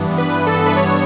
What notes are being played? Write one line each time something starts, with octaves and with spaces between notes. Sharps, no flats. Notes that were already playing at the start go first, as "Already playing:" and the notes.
Already playing: G2 E3 B3 D4
B4
A4
B4
C#5